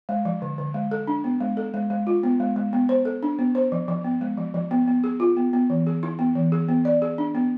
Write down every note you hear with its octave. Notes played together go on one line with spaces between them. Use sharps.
G#3
F3
D3
D3
G#3
A4
D4
B3
G#3
A4
G#3
G#3
F4
B3
G#3
G#3
B3
C5
A4
D4
B3
C5
F3
F3
B3
G#3
F3
F3
B3
B3
G#4
F4
B3
B3
E3
G#4
E4
B3
E3
G#4
B3
D5
G#4
D4
B3